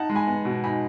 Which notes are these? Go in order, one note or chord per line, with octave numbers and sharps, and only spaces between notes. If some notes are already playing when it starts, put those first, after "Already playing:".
Already playing: D#4 F#5 A5
G#3
G#5 B5
B3
B2
D#4 G#5 B5